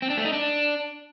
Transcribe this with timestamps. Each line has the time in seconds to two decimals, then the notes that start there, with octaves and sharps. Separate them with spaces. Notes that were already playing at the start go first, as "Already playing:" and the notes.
0.02 C4
0.10 D4
0.17 A3
0.25 D#4
0.33 D4